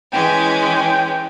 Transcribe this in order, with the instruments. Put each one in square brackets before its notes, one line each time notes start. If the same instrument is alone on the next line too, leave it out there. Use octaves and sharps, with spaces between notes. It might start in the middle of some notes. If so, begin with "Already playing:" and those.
[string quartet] E3 G#3 C#4 [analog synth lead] G5